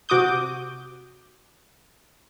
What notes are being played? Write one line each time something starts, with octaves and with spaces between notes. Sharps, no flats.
C3 F#4 D6 D#6 G6